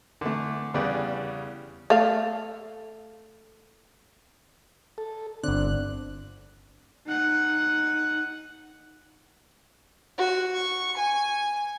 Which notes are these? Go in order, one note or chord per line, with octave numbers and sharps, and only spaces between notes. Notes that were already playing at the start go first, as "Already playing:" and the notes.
D3 E3 A3
E2 C#3 G3 B4 D5 G5
A3 F5
A4
G1 D3 C4 D4 F#6
D#4 F#5
F#4
C#6
G#5